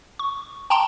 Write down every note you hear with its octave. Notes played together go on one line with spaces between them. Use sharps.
C#6
G5 A5 A#5 C6